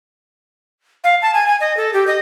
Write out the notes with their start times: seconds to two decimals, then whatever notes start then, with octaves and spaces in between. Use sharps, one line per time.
1.04 F5
1.22 A5
1.34 G#5
1.47 G#5
1.61 D#5
1.77 A4
1.94 G4
2.07 D#5